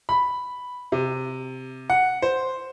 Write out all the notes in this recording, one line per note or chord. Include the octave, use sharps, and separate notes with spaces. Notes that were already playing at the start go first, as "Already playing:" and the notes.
B5
C3
F#5
C5